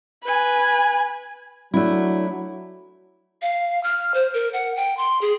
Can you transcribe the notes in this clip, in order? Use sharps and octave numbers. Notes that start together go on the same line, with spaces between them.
B4 G#5
F#3 A3 D4 E4
F5
F6
C5
A#4
F#5
G5
C6
G#4